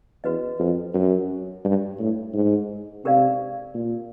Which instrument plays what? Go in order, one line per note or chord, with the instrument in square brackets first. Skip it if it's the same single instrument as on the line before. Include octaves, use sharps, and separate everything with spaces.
[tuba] E2 [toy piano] F#4 B4 D#5
[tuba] F2
F#2
G2
A2
G#2
[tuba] C3 [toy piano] G4 A#4 D5 F5
[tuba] A#2